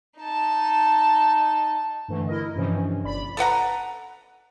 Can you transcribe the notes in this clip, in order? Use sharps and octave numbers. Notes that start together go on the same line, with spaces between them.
D#4 A5
G2 D3 E3 A3
E4 A#4 D#5
G2 C3 E3 F3 C#4
G1 D5 B5 B6
A4 B4 F#5 A#5